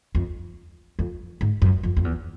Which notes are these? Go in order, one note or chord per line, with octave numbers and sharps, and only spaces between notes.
F2
F2
G#2
F#2
F2
F2
E2